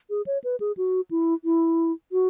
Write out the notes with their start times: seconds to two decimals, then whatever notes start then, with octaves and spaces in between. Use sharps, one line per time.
0.10 G#4
0.26 C#5
0.44 B4
0.60 G#4
0.77 F#4
1.11 E4
1.45 E4
2.12 F#4